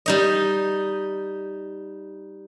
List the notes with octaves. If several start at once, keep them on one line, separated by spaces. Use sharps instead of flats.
G3 D#4 D#5